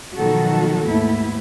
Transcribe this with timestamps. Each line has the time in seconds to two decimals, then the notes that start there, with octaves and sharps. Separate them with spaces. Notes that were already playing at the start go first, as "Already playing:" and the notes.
0.18 B2 D#3 F3 F#3 F#4 A4
0.86 D#2 G#2 A3 B3 E4